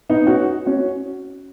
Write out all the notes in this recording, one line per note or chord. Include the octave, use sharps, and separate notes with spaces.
B3 D#4
C#4 F#4
C#4 F#4